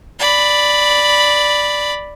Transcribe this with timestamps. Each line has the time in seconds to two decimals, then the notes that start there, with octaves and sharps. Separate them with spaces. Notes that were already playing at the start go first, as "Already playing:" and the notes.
0.19 D5 B5